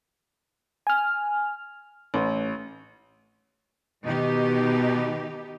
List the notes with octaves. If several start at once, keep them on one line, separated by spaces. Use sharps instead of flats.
G#5 F6
A1
B2 D#3 D#4 G4